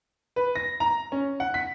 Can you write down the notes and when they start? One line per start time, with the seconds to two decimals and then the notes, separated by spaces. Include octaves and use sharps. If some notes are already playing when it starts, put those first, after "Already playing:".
0.36 B4
0.55 A#6
0.80 A#5
1.12 C#4
1.40 F#5
1.54 B6